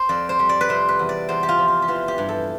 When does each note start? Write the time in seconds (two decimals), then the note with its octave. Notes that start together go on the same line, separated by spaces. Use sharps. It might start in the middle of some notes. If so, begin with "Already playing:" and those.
Already playing: C5
0.09 F2 D5
0.29 C5
0.39 G3
0.49 D5
0.61 B4
0.69 C3 C5
0.89 B4
0.99 E2
1.09 D5
1.29 E2 C5
1.43 G4
1.49 F4
1.58 F3
1.68 F4
1.82 G4
1.88 E3 F4
2.08 G4
2.18 G2
2.29 A4